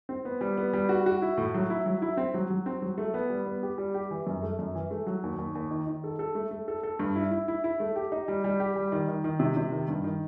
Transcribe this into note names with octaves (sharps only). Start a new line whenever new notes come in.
C4
B3
G3
B3
G3
F#4
F#4
E4
A2
F#3
E4
F#3
E4
C4
F#3
F#3
C4
F#3
A3
B3
G3
B3
G4
G3
G4
E3
F#2
A3
F#2
E3
A3
F#3
D#2
D#2
D#2
D#3
D#3
A4
A4
A3
A3
A4
A4
G2
E4
E4
E4
E4
A3
G4
D#4
G3
G3
G4
G3
D#3
D#3
D#3
C3
C3
D#3
G2
D#3